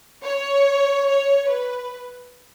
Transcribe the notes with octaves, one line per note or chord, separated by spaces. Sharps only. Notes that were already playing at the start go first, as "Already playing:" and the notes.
C#5
C#5
B4